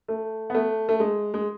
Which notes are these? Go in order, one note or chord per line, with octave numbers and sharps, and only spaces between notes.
A3
B3
A3
A3
G#3
G#3